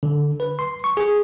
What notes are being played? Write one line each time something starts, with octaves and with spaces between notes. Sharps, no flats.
D3
B4
C6
C#6
G#4